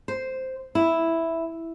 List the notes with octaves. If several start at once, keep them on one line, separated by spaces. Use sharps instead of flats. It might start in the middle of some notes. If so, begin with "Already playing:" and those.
C5
E4